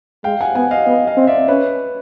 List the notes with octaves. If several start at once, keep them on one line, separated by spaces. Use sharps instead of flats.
G#3 F5 G5
F#5 G#5
B3 F#5 G#5
D#5 F5
B3
D#5 F5
C4
D5 E5
C#4 B4 C#5